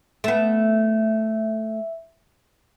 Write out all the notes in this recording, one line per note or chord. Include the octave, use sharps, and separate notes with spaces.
A3 B3 E5